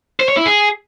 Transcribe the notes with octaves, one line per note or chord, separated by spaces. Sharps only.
C5
C#5
E4
G#4